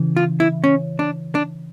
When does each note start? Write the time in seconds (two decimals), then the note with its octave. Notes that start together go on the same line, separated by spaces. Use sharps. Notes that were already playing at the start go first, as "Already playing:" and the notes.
Already playing: C#3 E3
0.16 F4
0.40 E4
0.64 C#4
0.99 D4
1.35 D4